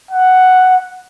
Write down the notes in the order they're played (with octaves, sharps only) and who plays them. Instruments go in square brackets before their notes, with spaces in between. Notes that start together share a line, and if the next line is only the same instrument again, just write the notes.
[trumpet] F#5